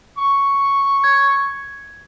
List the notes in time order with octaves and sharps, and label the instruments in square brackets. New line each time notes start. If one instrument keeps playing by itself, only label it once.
[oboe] C#6
[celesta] G#6